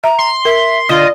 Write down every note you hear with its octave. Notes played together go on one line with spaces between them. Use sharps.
E5 A#5
C6
A#4 E5
D3 F4 D#5